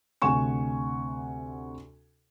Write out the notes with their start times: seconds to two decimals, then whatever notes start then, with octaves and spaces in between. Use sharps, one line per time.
0.22 D2 C3 F#5 G#5 C#6 E7